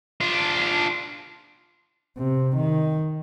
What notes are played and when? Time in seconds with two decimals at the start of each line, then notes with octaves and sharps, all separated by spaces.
0.21 D4 F4
2.18 C3
2.56 D#3